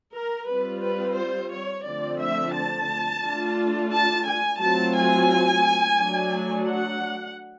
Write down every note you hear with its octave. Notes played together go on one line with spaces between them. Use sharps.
A#4
G3 C4 F4 B4
B4
C5
C#5
D3 F3 A3 C4 D5
E5
A5
A3 D4 F4
A5
G#5
F#3 A3 C4 F4 A5
G#5
F#3 A3 D4
F#5